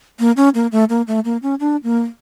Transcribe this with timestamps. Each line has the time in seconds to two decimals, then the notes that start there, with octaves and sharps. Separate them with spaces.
0.19 A#3
0.37 C#4
0.54 A#3
0.72 A3
0.89 A#3
1.07 A3
1.25 A#3
1.42 C#4
1.60 D4
1.83 A#3